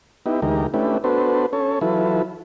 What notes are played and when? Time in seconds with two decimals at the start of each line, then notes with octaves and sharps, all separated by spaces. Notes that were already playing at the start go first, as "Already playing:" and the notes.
0.26 B3 D#4 E4 G4
0.42 D2 E3 G#3 D#4 G4 A#4
0.74 A3 C#4 D4 E4 G4 B4
1.04 B3 D4 F#4 A4 B4 C5
1.53 C#4 A4 C#5
1.81 E3 F#3 E4 F4 A4 B4